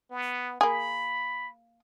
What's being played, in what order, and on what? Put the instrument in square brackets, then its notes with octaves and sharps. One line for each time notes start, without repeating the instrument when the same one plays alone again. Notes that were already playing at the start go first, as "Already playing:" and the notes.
[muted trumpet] B3
[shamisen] A#3 G#4 [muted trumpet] B5